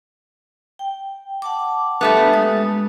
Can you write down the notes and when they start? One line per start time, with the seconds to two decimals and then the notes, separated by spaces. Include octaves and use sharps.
0.79 G5
1.42 F#5 A5 D6
2.01 G3 A3 B3 D4
2.31 G#3 D#6